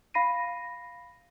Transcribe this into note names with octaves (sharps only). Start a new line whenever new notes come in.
F5 B5 A#6 C7 D#7